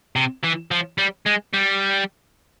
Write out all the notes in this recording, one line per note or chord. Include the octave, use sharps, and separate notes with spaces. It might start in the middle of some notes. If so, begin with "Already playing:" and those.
C3
E3
F3
G3
G#3
G3